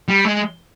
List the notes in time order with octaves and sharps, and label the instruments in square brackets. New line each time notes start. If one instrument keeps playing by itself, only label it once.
[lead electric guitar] G3
G#3